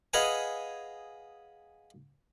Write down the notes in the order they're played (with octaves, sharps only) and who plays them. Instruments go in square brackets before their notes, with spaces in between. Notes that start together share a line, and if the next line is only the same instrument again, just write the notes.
[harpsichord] G#4 B4 D#5 F5 F#5 G#5